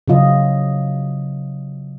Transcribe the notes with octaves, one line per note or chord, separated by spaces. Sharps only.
C#3 F#3 F4 D#5